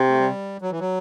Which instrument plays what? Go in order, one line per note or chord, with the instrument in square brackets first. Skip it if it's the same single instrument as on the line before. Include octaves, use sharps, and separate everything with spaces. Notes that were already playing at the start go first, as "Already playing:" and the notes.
Already playing: [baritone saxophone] C3
[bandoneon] A3
G3
F#3
E3
F#3